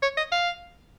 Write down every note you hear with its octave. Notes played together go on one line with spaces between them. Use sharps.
C#5
D#5
F5